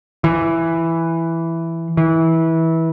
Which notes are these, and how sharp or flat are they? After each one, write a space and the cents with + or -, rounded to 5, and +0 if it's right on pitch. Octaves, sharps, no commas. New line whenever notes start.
E3 +5
E3 -20